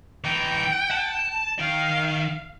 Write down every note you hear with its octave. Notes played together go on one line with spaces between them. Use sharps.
E3 D#4 G5
A5
D#3 F5 G5